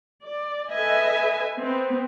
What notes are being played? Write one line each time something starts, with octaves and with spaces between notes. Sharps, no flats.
D5
A4 B4 D#5 E5 G#5
B3 C4